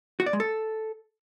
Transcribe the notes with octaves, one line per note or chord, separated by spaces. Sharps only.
F#4
D5
G#3
A4